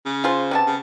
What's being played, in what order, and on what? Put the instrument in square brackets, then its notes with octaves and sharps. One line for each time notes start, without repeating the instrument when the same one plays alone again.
[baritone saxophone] C#3
[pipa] F4 G#4 C5
C3 B3 A5
[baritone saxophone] C#3